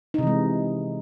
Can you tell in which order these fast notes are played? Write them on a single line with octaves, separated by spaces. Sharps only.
D#4 C3 E3 G#3